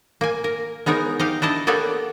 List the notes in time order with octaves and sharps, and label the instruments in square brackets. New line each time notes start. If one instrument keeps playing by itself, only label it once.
[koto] A#3 G#5
A#4
G#3 B3 D#4 A#4 C#5
D#4 G4 F5
D4 E4 D#5 A5
A#3 B3 G4 A4 C#5 D5